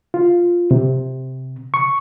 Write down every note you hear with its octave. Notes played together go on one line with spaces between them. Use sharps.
F4
C3
C#6